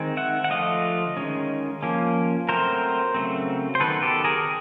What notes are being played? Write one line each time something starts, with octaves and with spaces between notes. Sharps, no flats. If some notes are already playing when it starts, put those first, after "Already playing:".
Already playing: D#3 G#3 C4
E5 F#5
F#5
D3 F3 A3 D#5 F5
D#3 G#3 C#4
F3 A#3 C#4
F#3 A3 C4 A#4 C5
C#3 F#3 A3 C4
C5
D#3 F#3 B3 A4 B4
G4 A4
G#4 A#4